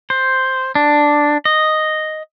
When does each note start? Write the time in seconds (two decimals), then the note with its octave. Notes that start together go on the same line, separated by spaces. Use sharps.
0.10 C5
0.75 D4
1.45 D#5